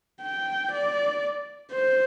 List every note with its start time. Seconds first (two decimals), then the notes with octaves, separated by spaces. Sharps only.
0.22 G5
0.72 D5
1.71 C5